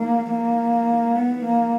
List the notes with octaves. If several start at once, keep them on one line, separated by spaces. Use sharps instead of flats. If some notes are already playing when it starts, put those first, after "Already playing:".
Already playing: A#3
A#3
B3
A#3